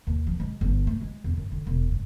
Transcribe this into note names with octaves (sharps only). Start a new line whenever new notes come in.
D#2
F3
G#3
G1
A3
G#3
E2
F#2
D3
E1
G2